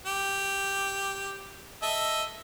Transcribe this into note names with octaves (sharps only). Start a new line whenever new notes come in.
G4
A4 D#5 E5